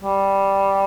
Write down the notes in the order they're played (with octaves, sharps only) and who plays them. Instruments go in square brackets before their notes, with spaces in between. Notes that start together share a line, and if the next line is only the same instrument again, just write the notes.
[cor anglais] G3